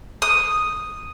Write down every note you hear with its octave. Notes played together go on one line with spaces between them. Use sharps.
D#6